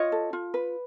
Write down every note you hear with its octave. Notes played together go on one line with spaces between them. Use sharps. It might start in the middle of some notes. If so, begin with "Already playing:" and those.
Already playing: F4 C#5 D#5
A4
F4
B4